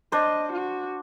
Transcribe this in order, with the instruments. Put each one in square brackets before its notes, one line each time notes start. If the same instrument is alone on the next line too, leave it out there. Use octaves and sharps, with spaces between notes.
[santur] D4 C5 [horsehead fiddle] D#5
[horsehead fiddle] F#4